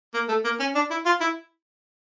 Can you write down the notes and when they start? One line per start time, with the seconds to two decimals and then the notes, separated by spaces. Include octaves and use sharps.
0.14 A#3
0.29 A3
0.44 A#3
0.60 C#4
0.75 D4
0.90 E4
1.06 F4
1.21 E4